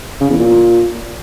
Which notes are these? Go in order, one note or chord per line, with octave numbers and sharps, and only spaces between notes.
C#3
E2
A#2